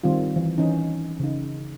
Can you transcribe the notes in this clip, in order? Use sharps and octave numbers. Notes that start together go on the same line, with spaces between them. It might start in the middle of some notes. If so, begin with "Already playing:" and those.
D#3 G3 C4 F4
E3
E3 C#4 D#4
C#3 D#4